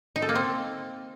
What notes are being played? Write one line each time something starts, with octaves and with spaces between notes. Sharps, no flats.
D#4
A4
A#3
C4